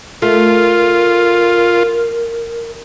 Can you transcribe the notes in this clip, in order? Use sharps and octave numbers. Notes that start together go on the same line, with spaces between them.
A3 F4 A#4